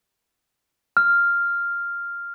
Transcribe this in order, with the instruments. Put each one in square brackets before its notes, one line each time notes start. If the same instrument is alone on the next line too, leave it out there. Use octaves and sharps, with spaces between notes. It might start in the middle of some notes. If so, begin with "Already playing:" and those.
[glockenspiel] F6